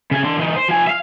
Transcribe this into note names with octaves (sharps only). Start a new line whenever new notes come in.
C#3 G#5
D4 C6
E3 D#4
C5
F3 G#5
E5 F5